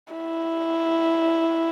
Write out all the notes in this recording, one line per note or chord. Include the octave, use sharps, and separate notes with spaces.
E4